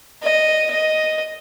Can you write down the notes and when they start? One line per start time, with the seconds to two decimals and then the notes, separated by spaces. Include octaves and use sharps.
0.23 D#5
0.70 D#5